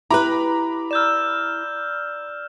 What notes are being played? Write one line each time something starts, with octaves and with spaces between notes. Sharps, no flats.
E4 G4 B4 A#5 B5 D6
D5 E6 F6 G6 E7